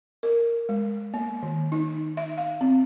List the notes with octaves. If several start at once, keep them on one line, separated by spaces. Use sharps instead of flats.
A#4
G#3
A#3
D#3
D#4
E5
F5
C4